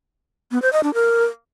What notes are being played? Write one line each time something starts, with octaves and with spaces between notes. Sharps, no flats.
B3
C5
D#5
D4
A#4